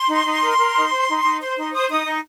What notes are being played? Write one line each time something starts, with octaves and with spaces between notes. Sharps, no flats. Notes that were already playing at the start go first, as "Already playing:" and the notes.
Already playing: C6
D#4
D#4
A#4
A#4
D#4
C5
D#4
D#4
C5 C6
D#4 C6
C5 D#6
D#4 D#6
D#4